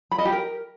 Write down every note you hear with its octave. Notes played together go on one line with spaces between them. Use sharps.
B5
D#5
G4
A#4